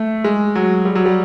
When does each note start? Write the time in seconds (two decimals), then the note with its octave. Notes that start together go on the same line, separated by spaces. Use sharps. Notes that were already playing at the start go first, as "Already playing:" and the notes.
Already playing: A3
0.24 G#3
0.55 F#3
0.85 G3
0.95 F#3
1.06 G3